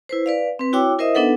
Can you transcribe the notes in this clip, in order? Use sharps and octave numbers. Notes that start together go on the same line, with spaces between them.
E4 B4 C5
B4 D5 F5
C4 B4
E4 F#4 C#5 G5 D6 E6
E4 A#4 C5 D#5 E5 D#6
B3 D4 D#4 A4 B4 F#5